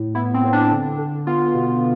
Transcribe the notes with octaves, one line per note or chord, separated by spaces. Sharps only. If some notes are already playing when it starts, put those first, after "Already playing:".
Already playing: A2
B3 E4
C4
A2
D4
D3
D3
B3 F4
B2